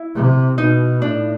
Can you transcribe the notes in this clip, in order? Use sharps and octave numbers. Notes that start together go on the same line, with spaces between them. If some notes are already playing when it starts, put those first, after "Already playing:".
Already playing: E4
C3
B2 D#4
A2 D4